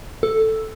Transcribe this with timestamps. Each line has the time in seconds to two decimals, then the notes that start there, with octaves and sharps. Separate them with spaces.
0.23 A4